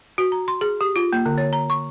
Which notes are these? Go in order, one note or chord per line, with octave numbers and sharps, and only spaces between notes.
F#4
A#5
C6
G#4
G4
F4
A#3
D3
C#5
A#5
C#6